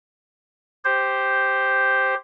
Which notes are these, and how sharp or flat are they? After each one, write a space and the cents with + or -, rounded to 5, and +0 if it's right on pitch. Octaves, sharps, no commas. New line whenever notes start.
G4 +0 C5 +0